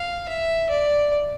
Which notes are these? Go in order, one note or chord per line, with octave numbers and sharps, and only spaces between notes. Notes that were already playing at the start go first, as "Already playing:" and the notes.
Already playing: F5
E5
D5